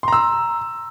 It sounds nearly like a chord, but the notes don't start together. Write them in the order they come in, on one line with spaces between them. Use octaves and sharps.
C6 A#5 E6